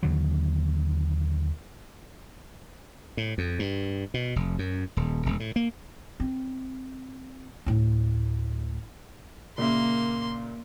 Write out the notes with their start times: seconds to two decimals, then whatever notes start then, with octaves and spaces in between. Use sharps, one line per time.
0.03 D#2 D3 F#3
3.17 A2
3.38 F2
3.59 G2
4.14 B2
4.36 F1
4.59 F#2
4.97 D#1
5.26 E1
5.40 A2
5.56 A#3
6.20 C4
7.66 D2 A2
9.58 A#2 C#3 A#3 E5 C6